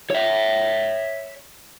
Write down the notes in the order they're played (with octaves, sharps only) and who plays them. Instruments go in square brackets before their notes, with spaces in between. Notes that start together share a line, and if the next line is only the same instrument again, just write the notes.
[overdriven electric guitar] C#5 E5